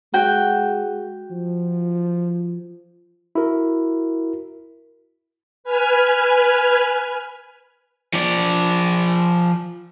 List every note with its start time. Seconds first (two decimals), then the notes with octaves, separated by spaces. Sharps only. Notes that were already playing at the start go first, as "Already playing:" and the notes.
0.14 G#3 F#4 G5
1.31 F3
3.35 E4 F#4 A#4
5.64 B4 G#5 F6
8.13 F3 D5